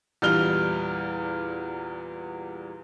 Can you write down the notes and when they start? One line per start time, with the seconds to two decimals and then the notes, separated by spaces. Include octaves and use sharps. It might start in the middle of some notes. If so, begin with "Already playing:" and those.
0.22 E2 A#2 G3 F6 G7